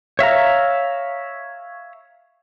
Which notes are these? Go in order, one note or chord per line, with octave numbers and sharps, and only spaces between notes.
C#5 E5 F5 A#5